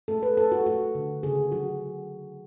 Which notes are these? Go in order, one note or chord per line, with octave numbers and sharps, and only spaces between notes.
A3 A4
B4
A3 A4
F#4
A3 F#4
D3
C#3 G#4
F#3 F#4
C#3